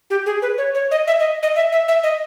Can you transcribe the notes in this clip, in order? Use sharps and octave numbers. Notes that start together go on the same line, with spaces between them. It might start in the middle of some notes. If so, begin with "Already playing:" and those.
G4
G#4
B4
C#5
C#5
D#5
E5
D#5
D#5
E5
E5
E5
D#5